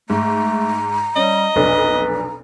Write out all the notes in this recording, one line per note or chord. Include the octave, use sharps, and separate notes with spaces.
G#2 A3 A#5
G3 C#4 D#5
F1 B1 D4 B4